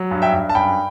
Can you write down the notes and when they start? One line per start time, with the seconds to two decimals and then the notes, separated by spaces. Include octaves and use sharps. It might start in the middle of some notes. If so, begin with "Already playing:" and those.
Already playing: F#3
0.11 G2
0.22 E5 G5
0.33 G2
0.49 A5
0.55 F#2 G5 B5